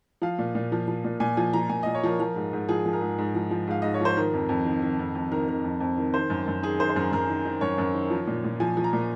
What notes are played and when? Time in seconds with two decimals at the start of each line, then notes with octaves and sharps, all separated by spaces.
0.22 F3 F5
0.39 A#2
0.55 A#2
0.72 F3
0.88 F3
1.04 A#2
1.20 A#2 G#5
1.37 F3 G#5
1.53 F3 A#5
1.69 A#2 G#5
1.83 A#2 D#5
1.95 C#5
2.03 F3 A#4
2.20 F3 A#4
2.36 G#2
2.53 G#2
2.69 F3 G#4
2.86 F3
2.93 A#4
3.01 G#2
3.18 G#2
3.35 F3
3.51 F3
3.67 G#2 F5
3.82 G#2 D#5
3.94 C#5
4.01 F3 C5
4.17 D#3 A#4
4.33 F2
4.49 F2
4.65 D#3
4.82 D#3
4.99 F2
5.15 F2
5.32 D#3 A#4
5.48 D#3 A#4
5.64 F2
5.80 F2
5.98 D#3
6.14 D#3 C5
6.30 F#2
6.47 F#2
6.63 D#3 G#4
6.79 D#3 C5
6.89 C5
6.96 F#2 A#4
7.12 F#2 A#4
7.29 D#3
7.45 D#3
7.61 F#2 C#5
7.78 F#2
7.94 D#3
8.10 F3
8.27 A#2
8.44 A#2
8.60 F3 G#5
8.77 F3
8.84 A#5
8.93 A#2